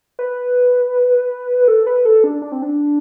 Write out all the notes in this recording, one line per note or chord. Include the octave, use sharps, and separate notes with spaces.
B4
A4
B4
A4
D4
D4
C4
D4